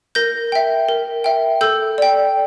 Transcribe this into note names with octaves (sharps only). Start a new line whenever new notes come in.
A#4 G6 A#6
E5 G5
A#4
E5 G5
A4 E6 G6
D5 G5